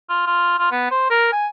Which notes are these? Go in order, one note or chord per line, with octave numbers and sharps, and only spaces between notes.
F4
F4
F4
B3
C5
A#4
G#5